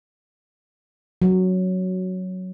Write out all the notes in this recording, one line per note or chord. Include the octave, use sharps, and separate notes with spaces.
F#3